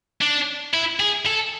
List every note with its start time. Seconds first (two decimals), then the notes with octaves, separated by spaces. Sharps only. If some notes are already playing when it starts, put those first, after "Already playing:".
0.21 D4
0.74 E4
1.00 G#4
1.27 A4